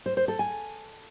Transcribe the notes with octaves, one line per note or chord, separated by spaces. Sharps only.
C5
C5
A4
G#5